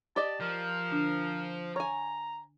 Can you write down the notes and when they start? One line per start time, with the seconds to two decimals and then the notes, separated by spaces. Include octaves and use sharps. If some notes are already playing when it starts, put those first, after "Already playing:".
0.16 G4 D5 D#5 A5
0.41 F3 A#4
0.90 D3 D4
1.76 C#5 G#5 A#5